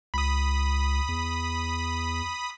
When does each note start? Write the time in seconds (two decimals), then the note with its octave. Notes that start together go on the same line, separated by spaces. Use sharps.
0.14 C#2 B5 D#6
1.08 E2